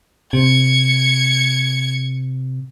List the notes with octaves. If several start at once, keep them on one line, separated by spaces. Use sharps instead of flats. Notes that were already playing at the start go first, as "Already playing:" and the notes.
C3 G#6 C#7